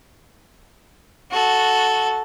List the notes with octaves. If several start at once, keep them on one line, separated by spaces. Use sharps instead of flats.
F#4 A4